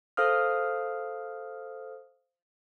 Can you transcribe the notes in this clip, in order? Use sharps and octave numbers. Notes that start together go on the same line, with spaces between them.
A4 C5 F5 D#6 F6